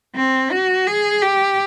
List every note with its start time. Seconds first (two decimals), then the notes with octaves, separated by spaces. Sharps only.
0.15 C4
0.51 F#4
0.87 G#4
1.22 G4